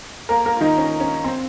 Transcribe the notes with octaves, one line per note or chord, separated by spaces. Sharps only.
A#3 A#4
A#3 A#4
F4
D#3 D#4
C#4
C#4
C4